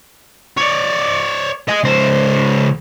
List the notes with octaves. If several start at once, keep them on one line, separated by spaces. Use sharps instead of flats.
C#5 D5
D#5 G#5
C#2 C5